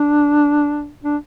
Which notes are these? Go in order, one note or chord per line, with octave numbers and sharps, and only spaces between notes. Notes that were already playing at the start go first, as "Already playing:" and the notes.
Already playing: D4
D4